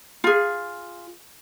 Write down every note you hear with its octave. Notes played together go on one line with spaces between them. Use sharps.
F4 G#4